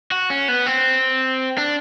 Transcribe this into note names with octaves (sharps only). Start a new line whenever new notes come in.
F#4
C#4
B3
C4
D4